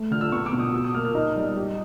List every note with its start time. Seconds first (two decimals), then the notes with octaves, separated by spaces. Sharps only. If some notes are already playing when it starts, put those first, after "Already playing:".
Already playing: A3
0.11 D3 F6
0.21 E6
0.32 B3 C#6
0.46 D6
0.53 B2
0.59 D#6
0.73 F#4 E6
0.84 D#6
0.94 A#3 F6
1.05 F6
1.15 D#4
1.36 G3
1.57 G4